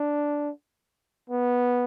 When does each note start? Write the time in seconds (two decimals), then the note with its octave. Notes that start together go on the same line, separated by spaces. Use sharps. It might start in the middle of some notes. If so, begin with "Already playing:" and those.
Already playing: D4
1.30 B3